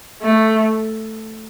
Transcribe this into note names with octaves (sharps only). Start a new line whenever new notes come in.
A3